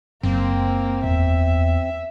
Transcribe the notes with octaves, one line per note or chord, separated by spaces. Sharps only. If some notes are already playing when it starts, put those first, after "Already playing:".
F#1 A#3 C4
E2 E5